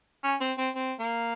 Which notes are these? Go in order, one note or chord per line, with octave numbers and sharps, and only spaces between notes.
C#4
C4
C4
C4
A#3